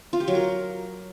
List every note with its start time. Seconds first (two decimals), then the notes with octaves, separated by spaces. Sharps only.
0.13 F4
0.20 G4
0.28 F#3
0.35 A#4